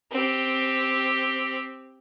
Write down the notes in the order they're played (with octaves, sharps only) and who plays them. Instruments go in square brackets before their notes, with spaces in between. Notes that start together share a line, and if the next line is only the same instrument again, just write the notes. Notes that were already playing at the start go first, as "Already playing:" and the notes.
[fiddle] C4 G4